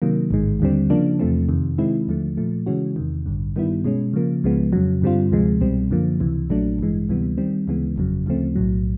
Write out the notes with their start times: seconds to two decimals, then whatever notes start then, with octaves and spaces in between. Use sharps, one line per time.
0.02 C3 D#3 F#3 A#3
0.31 A1 G#2 D#3 G#3
0.60 D#2 D3 G3 C4
0.90 C#3 F3 A#3 D4
1.19 E2 C3 F3 A3 C4
1.49 F2 C3 D#3
1.78 C3 D#3 G#3 C4 E4
2.08 D#2 D3 F3 A3
2.37 A#2 F3 A3
2.66 C#3 E3 G#3 C#4 F#4
2.96 E2 C3 D#3
3.26 A1 G2 D3
3.56 G2 D#3 G3 B3 E4
3.85 B2 G#3 C#4
4.13 C#3 F3 A#3
4.44 C#2 C#3 F3 G#3 B3
4.73 F2 C#3 F#3
5.02 G2 D3 G3 C4 F4
5.32 D2 C3 F3 G#3
5.61 C2 B2 G3 C4
5.91 F#2 D3 F3 A#3
6.20 C#2 C3 E3
6.50 A#1 A#2 F#3 A3 D4
6.79 A1 G2 E3 G#3
7.09 D2 C3 E3 G3 B3
7.38 D#3 G3 C4
7.68 D2 C#3 E3 G#3 B3
7.96 G1 F2 C#3 F#3
8.26 D2 C#3 F3 A3 C4
8.56 B1 A2 F#3